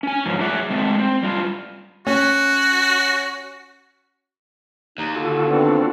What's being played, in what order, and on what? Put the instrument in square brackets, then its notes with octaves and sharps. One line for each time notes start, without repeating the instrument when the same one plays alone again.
[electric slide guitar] C#4 G#5
G#2 F3 F#3
F#3 F#4 G#4 D5 E5 F#5
G#3 A3 C4
C4
G3 F4
[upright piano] C#4 [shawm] F#4
[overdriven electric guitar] D#2 [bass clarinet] D#4
[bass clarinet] D3 [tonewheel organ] F4 F#4 A4
[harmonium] B3 C4 D4